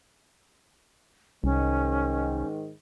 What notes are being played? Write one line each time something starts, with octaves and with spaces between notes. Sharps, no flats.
C2 G#2 D#3 C#4